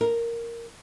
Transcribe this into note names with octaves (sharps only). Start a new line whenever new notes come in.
A#4